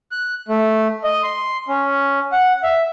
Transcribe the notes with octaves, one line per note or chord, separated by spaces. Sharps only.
F#6
A3
D#5
C6
C#4
F#5
E5